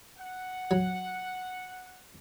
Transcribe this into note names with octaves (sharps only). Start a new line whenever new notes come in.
F#5
F#3